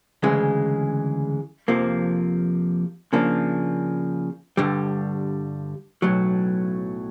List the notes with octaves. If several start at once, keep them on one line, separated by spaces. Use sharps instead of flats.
D2 C#3 E3 G#3
F2 C3 F3 A#3
C#3 F3 A#3 D4
G2 D3 G3
B1 A2 F#3